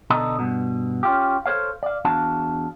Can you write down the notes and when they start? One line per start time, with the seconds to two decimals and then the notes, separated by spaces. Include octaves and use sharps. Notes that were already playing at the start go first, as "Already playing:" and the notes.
0.10 B2 D3 A4 D#5 A#5
0.39 G2 B2
1.03 C#4 F4 G4
1.46 A4 C5 C#5 F5
1.83 D5 F5
2.05 E2 D4 F#4 F5 A5